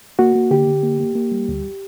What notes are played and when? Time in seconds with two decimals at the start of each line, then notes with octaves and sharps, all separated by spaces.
0.19 A#3 F#4
0.35 A#3
0.51 D3 G4
0.67 D3
0.83 A#3
1.00 A#3
1.15 A#3
1.32 G3
1.49 D2